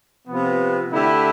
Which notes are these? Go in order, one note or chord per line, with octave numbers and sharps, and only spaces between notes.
C3 F3 B3
D3 A3 E4 G4